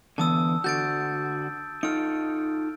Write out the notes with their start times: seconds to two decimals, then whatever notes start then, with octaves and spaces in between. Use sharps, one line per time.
0.18 D3 E3 B3 A5 D#6 E6
0.64 D3 F#4 G6 A6 D7
1.83 D#4 F4 A4 F6 D7